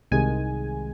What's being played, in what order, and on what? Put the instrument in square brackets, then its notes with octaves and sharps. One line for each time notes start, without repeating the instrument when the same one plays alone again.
[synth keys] C2 C3 D#3 G#3 G#5